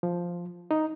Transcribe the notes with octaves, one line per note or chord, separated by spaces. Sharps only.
F3
D#4